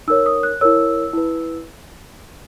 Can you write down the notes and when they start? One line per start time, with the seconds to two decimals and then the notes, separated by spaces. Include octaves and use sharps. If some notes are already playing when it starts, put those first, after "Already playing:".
0.08 D#4 A#4 C#5 E6
0.26 D#6
0.43 F#6
0.61 E4 A#4 C#5 E6
1.13 E4 B4